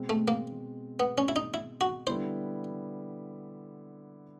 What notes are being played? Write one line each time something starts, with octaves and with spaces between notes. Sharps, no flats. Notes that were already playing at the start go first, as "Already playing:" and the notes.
Already playing: B2 G#3 C4
A3
A#3
B3
C#4
E4
D#4
E4
F#4
D3 G3 B3 E4 C5